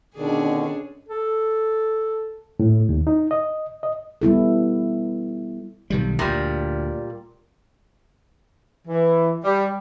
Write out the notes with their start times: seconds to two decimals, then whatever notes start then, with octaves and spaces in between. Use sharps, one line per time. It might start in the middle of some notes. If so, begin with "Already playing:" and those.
0.16 B2 D3 D#3 C#4 D4 G#4
1.09 A4
2.60 A2
2.89 D#2
3.07 D#4
3.31 D#5
3.83 D#5
4.22 G3 B3 E4 A4
5.90 B1 D#3 G3
6.19 D2 A#2 G3
8.87 E3
9.44 G3